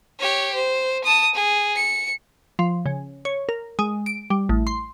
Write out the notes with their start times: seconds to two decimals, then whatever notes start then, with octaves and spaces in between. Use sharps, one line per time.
0.19 G4 C#5
0.54 C5
1.04 A5 D#6
1.35 G#4
1.75 C#7
2.59 F3
2.86 C#3
3.25 C#5
3.49 A#4
3.79 G#3
4.06 D7
4.30 G3
4.49 A1
4.67 C6